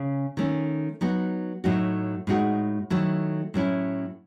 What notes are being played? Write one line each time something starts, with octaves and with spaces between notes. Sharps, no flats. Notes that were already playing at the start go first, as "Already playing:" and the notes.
Already playing: C#3 C#4
D#3 A3 C#4
F#3 B3 D#4 F#4
A2 F#3 A3 D#4 F#4
A2 G#3 D#4 F#4
D#3 F#3 A3 E4
A2 F#3 C#4 E4